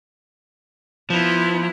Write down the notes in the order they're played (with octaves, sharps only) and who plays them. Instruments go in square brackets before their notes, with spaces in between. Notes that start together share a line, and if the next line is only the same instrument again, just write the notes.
[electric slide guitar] F3 [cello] B3 E4